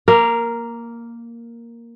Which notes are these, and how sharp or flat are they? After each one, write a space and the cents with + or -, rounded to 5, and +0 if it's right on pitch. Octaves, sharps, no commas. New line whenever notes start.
A#3 +0 A#4 +0 F5 -25